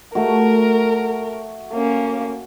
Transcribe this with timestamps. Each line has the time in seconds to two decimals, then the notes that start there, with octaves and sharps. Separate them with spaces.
0.15 A3 F#4 A#4
1.73 A#3 C#4